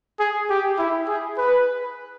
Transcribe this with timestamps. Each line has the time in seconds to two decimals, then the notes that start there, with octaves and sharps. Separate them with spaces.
0.20 G#4
0.50 G4
0.78 E4
1.08 G#4
1.38 B4